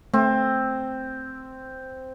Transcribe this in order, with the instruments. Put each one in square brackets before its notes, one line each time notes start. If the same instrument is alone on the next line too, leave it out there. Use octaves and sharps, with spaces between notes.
[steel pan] A3 [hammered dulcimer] C4